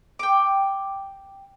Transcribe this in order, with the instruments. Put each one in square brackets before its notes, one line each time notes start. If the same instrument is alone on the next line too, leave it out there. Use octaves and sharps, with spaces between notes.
[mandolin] G5 D6